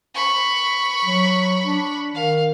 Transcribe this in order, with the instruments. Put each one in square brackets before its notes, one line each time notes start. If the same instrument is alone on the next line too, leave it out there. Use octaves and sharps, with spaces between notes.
[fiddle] B5 C#6
[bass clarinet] F#3
D4
[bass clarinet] D#3 [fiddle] F5